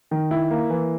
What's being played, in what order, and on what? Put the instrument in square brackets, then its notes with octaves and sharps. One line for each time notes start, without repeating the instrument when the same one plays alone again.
[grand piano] D#3
E4
A#3
E3